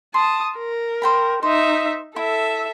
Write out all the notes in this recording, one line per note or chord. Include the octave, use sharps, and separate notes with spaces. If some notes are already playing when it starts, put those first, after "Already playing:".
A5 C6 D#6
A#4
C5 G5 B5
D#4 C5 E5
E4 A4 E5